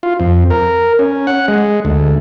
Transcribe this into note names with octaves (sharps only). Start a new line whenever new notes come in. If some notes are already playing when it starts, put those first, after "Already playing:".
F4
F2
A#4
C#4
F#5
G#3
D2